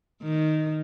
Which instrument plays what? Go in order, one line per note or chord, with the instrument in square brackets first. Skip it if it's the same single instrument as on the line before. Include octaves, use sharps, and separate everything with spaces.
[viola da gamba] D#3